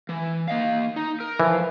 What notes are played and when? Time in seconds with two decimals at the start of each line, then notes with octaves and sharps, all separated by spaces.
0.09 E3
0.48 A#3 D#5 F5
0.96 D#4
1.20 A#4
1.40 E3 F3